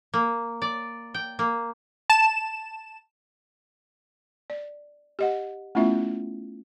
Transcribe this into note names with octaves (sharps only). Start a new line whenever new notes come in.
A#3
D5
G5
A#3
A5 E7
D5
G4 D#5 F#5
A3 B3 C#4 E4 F4 E5